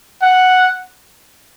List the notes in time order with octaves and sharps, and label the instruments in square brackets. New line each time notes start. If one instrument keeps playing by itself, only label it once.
[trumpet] F#5